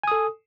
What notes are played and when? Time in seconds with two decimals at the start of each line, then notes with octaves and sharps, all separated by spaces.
0.03 G#5
0.07 D#6
0.12 A4